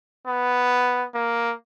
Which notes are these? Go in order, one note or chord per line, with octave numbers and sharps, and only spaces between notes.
B3
A#3